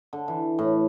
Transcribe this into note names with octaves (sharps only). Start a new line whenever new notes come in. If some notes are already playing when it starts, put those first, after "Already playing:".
D3
E3
A2